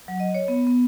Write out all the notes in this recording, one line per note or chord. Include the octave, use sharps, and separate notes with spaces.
F#3
D#5
C#5
B3
B3